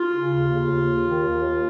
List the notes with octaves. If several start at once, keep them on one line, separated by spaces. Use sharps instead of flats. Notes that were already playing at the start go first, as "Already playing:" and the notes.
Already playing: F4
C#3
D#2
C#3
D#2
D#2
D#3
D#2
D#2